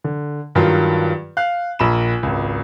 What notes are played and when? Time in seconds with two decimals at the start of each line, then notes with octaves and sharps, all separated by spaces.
0.04 D3
0.55 G2 D#3 F#3 F4
1.37 F5 F#6
1.79 A#1 A#4 B5 E7
2.23 G#1 C#2